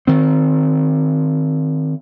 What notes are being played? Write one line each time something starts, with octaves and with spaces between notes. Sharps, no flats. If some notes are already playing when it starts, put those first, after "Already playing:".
D#3 C4